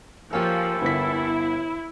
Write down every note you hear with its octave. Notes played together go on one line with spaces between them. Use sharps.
F3 A#3 C#4 G4 A4 G#5 F6
G1 B3 E4 B6